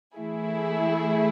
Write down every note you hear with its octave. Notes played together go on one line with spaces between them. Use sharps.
E3 A3 E4 G#4